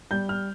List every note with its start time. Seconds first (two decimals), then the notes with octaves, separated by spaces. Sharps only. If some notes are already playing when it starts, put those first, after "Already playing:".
0.11 G3 G6
0.29 F6